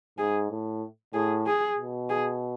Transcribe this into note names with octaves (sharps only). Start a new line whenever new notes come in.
G#2 G#4
A2
A2 G#4
G#4
B2
G#4